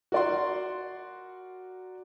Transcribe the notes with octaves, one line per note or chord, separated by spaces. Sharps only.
F#4 A#4 D5 F#5 C6